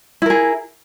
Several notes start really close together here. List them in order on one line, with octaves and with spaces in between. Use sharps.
E4 A#4 G#4